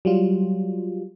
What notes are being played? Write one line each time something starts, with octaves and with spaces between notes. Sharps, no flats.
F#3 G3 F4